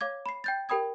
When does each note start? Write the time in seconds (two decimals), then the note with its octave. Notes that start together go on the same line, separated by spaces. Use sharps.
0.01 C#5 F5 D6 G#6
0.26 B5 C7
0.44 G5 G6 A6
0.69 G4 A#4 G5 B5 D#6 G#6